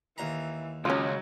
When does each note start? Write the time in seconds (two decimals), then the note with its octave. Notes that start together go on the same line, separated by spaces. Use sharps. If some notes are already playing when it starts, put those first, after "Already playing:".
0.18 D#2 E3 A#5
0.85 C#2 F#3 C#4 F4